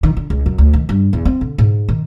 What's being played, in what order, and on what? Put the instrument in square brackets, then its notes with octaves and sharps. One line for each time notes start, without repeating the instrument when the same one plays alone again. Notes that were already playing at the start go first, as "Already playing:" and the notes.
[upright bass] D#3
D3
C#2
F#2
D2
D#3
G2
E2
C4
D3
G#2
D#3